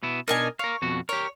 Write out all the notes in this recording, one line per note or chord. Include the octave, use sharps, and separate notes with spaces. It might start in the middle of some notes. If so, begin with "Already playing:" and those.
B2 B3 E4
B2 D4 D#4 A#4 D#5 G#5
A#4 C#5 F5
F2 B2 F#4
G4 A#4 C#5